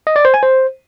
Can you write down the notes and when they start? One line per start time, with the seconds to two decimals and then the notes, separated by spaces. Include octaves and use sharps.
0.07 D#5
0.16 D5
0.25 C5
0.34 G#5
0.43 C5